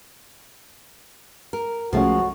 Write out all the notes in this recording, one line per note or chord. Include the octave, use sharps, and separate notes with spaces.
A#4
C2 F3 G#3 A3 C#4 F#4